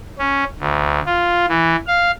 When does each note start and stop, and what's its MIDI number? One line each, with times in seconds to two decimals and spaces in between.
0.19 0.44 61
0.60 1.00 38
1.06 1.46 65
1.49 1.76 52
1.87 2.11 77